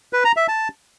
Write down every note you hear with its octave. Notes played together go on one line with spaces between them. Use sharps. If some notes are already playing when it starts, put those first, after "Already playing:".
B4
A#5
E5
A5